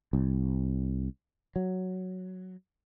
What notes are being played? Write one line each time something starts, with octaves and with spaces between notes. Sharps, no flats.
C2
F#3